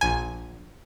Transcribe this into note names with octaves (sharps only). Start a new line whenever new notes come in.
A#1 G#5